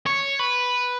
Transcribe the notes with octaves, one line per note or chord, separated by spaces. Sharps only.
C#5
B4